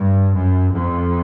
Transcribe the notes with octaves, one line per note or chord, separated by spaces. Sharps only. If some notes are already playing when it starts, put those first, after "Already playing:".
Already playing: G2
F#2
F2